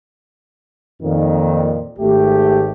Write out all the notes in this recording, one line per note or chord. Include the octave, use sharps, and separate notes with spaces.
F2 A#2 D#3
G#1 A3 G4